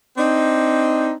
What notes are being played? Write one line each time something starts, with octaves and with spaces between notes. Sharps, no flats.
C4 D4 D#4